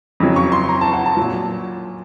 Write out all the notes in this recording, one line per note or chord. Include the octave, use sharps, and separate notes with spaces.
F2 C#3 F#3
C#6
C6
A#5
A5
F#5
A5
A#2 F#3